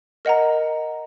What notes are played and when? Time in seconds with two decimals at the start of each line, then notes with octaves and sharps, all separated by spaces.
0.25 A#4 D#5 F#5 A#5